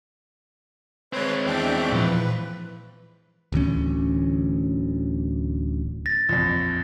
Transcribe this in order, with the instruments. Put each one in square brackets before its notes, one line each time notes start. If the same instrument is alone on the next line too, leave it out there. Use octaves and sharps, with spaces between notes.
[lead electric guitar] G#3 C4 [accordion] B4 C#5
[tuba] E2 [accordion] D4 E5 G5
[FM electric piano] A#2 F3 [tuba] E3 [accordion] B4
[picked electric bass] D1 D2 E3 C#4
[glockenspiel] A6 A#6
[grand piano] A#1 F2